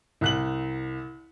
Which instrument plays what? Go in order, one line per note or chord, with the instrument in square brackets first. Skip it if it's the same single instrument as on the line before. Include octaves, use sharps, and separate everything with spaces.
[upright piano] C2 F#6 F#7